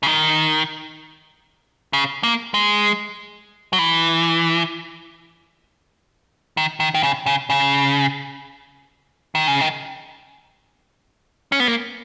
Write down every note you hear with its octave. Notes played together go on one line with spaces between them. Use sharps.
C#3
D#3
C#3
A#3
G#3
F#3
E3
D#3
D#3
D#3
C#3
C#3
C#3
D#3
C#3
D#3
C#4
B3
A#3